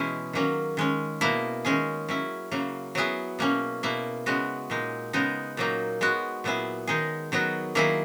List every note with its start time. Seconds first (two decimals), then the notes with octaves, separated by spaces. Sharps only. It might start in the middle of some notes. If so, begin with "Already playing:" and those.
Already playing: B2 E3 G#3 C#4 E4 G#4
0.33 D#3 F#3 A#3 C#4
0.77 D#3 G#3 C#4
1.21 B2 A#3 E4
1.65 D#3 G#3 C#4 G#4
2.08 F#3 C#4 E4
2.51 C#3 F#3 A#3
2.95 F#3 B3 E4 G#4
3.39 B2 A#3 C#4
3.83 B2 A#3 E4
4.26 C#3 G#3 B3 F#4
4.70 A#2 G#3 D#4
5.13 C#3 G#3 B3 D#4
5.57 A#2 F#3 A#3 D#4
6.01 G#3 B3 F#4
6.44 A#2 F#3 B3 E4 G#4
6.87 D#3 G#3 D#4 G#4
7.32 D#3 F#3 B3 F#4
7.75 D#3 F#3 A#3 E4 G#4